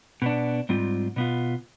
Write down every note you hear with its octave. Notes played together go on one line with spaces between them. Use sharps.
B2 B3 D4
G#2 G3 C4 F4
B2 B3 F4